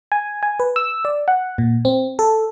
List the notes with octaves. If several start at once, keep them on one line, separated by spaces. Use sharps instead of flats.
G#5
G#5
B4
E6
D5
F#5
A#2
C4
A4